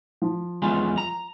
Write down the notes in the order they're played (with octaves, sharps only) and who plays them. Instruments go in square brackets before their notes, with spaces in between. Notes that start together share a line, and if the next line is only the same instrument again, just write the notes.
[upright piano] F3
[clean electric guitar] E2 G#3 F4
A#5